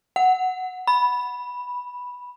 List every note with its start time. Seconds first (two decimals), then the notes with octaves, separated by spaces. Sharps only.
0.16 F#5
0.87 B5